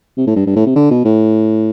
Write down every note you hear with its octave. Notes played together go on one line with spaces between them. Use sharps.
C3
A2
G2
G2
A2
C3
D3
B2
A2